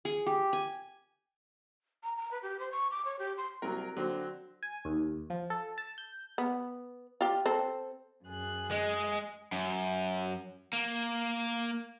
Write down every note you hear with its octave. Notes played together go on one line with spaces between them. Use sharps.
G#4
G4
G#5
A#5
A#5
B4
G4
C5
C#6
D6
C#5
G4
C6
C2 F#3 A#4
D3 F#3 C4
G#5
D#2
F3
A4
A5
G6
B3
F4 G4
C4 A4
F#2 G#4 F#6
G#3 D#5
F#2
A#3